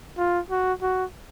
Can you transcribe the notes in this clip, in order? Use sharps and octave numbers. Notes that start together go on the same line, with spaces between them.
F4
F#4
F#4